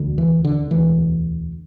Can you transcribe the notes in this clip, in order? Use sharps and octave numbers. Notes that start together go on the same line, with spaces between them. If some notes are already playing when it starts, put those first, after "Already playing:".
Already playing: E1 D2 D3
E3
D3
E1 D2 D3 E3